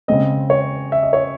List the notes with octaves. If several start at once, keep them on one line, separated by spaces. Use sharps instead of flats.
C#3 G#3 C4 D#5
C#5
E5
D#5
C#5